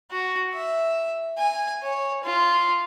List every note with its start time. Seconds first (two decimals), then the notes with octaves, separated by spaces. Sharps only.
0.11 F#4
0.54 E5
1.38 G#5
1.83 C#5
2.24 F4